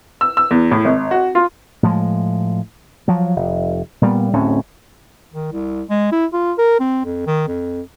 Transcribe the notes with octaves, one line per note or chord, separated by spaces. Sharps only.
E6
E6
E2
A2
G#1
F#4
F4
A2 F3 G#3
F3 F#3
F1
A#2 G3 B3
D1 A2 C4 C#4
D#3
C2
G#3
E4
F4
A#4
C4
F2
D#3
F2